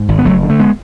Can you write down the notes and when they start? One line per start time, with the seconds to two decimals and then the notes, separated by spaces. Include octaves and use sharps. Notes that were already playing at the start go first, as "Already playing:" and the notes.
Already playing: G#2
0.08 G#1
0.18 B3
0.25 F#1 F#3 A3
0.43 D3
0.50 A3
0.59 G#3 B3